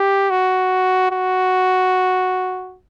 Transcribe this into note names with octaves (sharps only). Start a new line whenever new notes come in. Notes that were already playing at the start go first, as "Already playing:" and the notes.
Already playing: G4
F#4
F#4